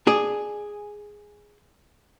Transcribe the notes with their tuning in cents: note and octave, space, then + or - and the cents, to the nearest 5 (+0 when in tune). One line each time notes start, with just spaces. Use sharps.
G#4 +0 D5 +25 A5 +0